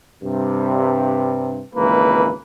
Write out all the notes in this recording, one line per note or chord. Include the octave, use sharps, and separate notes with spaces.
G2 C3
G#1 C#2 E3 A#3 B4